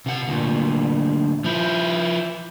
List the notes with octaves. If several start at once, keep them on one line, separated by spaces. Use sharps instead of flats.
C3 F#5
D2 A#2
F3 E4